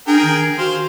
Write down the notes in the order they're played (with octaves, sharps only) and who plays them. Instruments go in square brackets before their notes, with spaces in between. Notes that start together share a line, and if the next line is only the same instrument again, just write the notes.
[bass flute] D4 [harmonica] G#4 A#4 G5
[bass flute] D#3
[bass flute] F#4 [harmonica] C5 F5